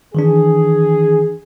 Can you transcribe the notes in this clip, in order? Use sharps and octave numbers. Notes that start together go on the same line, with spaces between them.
D#3 E3 D4 G#4